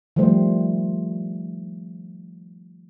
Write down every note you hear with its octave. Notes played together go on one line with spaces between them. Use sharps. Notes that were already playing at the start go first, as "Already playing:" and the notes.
D#3 F3 G3 A3 C5